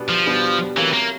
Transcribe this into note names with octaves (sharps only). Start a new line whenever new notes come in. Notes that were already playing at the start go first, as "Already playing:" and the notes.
Already playing: B2 G3 B3 D4
F3
B2 G3 B3 D4
E3 F#3 A3 C4 F4 A#4
A#3